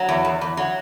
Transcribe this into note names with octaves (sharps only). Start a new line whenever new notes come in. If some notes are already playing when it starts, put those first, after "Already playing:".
Already playing: F#3
E2
E2
E2
F#3